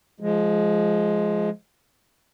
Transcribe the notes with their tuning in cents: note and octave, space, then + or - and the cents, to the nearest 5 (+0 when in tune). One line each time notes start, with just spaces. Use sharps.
F3 -5 G#3 +10